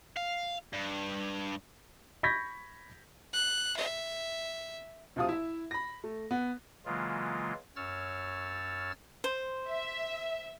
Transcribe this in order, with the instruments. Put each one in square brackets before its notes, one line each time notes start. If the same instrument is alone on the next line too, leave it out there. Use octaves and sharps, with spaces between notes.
[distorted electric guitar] F5
G2
[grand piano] B5 C#6 G6 G#6 A#6 B6
[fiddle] F#6
E5
[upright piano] D2 C3 F3 F4 D#6
E4 E5
B5 A#6
A3
B3
[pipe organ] C#3 E3 F#3 G#3 A#3 F4
F#2 C#5 E6 F6 A6
[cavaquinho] C5
[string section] E5